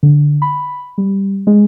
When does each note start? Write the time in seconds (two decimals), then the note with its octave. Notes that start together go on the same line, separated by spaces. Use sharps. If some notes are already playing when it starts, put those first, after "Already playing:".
0.03 D3
0.42 B5
0.98 G3
1.47 G#3